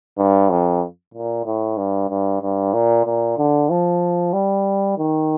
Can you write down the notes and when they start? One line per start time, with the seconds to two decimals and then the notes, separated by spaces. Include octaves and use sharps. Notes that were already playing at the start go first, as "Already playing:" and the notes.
0.18 G2
0.50 F2
1.14 A#2
1.46 A2
1.77 G2
2.09 G2
2.42 G2
2.74 A#2
3.06 A#2
3.37 D3
3.70 F3
4.33 G3
4.97 D#3